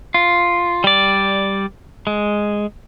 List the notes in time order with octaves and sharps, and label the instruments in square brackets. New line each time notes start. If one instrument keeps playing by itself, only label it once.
[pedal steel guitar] F4
G3 D5
G#3